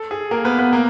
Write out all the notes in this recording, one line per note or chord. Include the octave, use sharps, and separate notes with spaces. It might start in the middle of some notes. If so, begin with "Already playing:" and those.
Already playing: A4
G#4
A#3 A#4
B3 B4
B3 B4
A#3 A#4